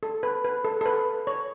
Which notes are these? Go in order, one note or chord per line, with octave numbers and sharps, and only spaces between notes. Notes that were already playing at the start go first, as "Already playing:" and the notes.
A4
B4
B4
A4
A4
B4
C#5